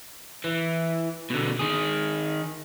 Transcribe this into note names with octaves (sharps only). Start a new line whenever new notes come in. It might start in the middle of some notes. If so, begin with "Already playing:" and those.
E3
B2 D3
D#3 G#4